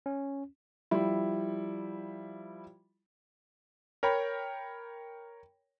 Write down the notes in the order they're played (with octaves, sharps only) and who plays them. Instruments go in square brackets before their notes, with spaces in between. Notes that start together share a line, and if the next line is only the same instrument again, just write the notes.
[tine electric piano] C#4
[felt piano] F3 G3 E4
[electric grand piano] A#4 C#5 G5 A#5 B5